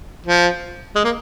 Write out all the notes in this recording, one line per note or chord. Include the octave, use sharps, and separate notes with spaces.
F3
G#3
A#3